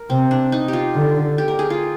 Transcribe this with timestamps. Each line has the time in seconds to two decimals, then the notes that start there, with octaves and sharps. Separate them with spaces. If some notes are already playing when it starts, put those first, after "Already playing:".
Already playing: A#4
0.10 C3 C4
0.31 D4
0.52 D#4
0.68 F4 G4
0.95 D3
1.38 G4
1.48 A#4
1.59 G#4
1.70 F4